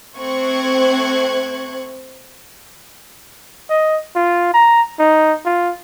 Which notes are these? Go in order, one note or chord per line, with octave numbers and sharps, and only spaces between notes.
A3 C4 C5 C#6 F#6 G#6
D#5
F4
A#5
D#4
F4